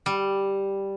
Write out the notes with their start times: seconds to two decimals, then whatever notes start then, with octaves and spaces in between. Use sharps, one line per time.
0.06 G3